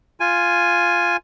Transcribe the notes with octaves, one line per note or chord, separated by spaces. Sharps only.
F4 G#5